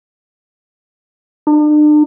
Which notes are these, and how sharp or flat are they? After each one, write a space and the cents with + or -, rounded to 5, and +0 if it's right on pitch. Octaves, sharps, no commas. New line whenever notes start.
D4 +40